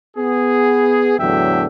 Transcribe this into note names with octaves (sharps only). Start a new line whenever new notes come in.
B3 G#4
E2 A2 D3 F#3 E5 G5